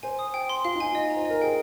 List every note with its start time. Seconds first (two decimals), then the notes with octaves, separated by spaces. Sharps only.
0.03 C5 G#5
0.19 D#6
0.34 G5
0.49 C6
0.65 F4 F5
0.75 D#4
0.80 F4 G#5
0.95 D#5
1.10 A#5
1.16 C5
1.25 A#4 D#5
1.41 G#4 G5